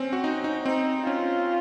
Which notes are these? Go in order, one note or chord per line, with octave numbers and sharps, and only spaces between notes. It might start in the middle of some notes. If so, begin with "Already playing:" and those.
Already playing: C4 C#4
F#4
D#4
D#4
C4 D#4
C#4 F4